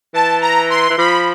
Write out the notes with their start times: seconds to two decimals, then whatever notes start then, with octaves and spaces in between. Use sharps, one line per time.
0.14 E3 A5
0.41 A#5
0.70 C6
0.90 E3
0.98 F3 B5